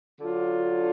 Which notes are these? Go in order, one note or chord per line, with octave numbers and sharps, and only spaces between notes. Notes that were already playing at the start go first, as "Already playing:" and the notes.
D3 F#3 D4 F4